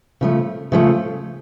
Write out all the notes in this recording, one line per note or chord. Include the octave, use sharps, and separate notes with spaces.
C#3 F3 A3
C#3 F3 A3